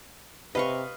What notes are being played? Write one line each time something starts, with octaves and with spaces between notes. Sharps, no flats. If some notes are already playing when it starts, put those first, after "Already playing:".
C3 B4 D#5 F5 C#6